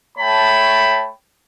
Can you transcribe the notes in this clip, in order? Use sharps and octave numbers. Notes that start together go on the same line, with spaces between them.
A3 C#5 G5 A5 B5